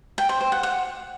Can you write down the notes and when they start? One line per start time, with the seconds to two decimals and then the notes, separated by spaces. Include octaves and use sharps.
0.18 G5
0.29 C5
0.41 C5
0.52 F#5
0.63 F#5